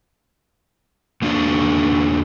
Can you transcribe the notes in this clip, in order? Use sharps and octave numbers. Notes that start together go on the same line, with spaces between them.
E2 A#3 D4 F#4 D5